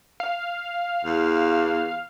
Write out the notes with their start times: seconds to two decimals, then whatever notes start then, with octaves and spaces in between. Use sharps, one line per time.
0.20 F5
1.04 E2